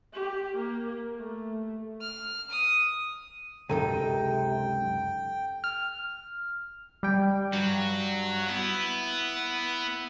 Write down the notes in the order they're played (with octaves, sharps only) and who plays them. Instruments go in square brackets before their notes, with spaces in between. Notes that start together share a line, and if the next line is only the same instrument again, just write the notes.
[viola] G4
A#3
A3
[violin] F6
D#6
[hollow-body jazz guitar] C#2 F#2 D#4 [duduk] C3 [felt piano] A4 A#5 D#7 [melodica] G5
[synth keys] F6
G3 G5
[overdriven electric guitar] G2 [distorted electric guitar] F#3 F#4
[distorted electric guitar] B3 [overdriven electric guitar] E4